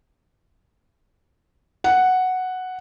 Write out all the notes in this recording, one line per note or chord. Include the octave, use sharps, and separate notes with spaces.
F#5